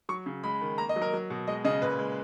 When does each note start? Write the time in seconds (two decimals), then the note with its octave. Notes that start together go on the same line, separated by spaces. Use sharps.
0.09 F#3 C#6
0.26 C#3
0.44 G#3 B5
0.61 D#3
0.78 A#3 A#5
0.89 D#5
0.96 F#3
1.02 A#4
1.13 F#3
1.30 B2
1.47 G#3 D#5
1.64 C#3 D#5
1.82 A#2 B4
1.99 G#3